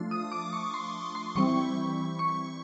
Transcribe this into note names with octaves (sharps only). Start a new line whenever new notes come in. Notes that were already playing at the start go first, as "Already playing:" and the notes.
Already playing: F3 A3 D4 F4
D#6
D6
C#6
C6
C6
E3 G3 C4 E4 C#6
C#6